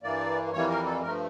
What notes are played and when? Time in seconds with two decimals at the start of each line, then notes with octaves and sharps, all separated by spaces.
0.03 G2 E3 A#3 D5
0.53 F2 E3 G3 A#3 C#5
0.69 A#4
0.86 A4
1.02 G2 F3 A3 A#4